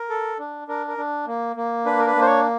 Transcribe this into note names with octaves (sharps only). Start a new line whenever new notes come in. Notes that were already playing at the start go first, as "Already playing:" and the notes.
Already playing: A#4
A4
D4
D4 A#4
A#4
D4
A#3
A#3
D4 B4
A#4
B4
A#3
C5
C#5